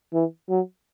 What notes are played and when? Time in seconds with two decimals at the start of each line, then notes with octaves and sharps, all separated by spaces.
0.13 E3
0.49 F#3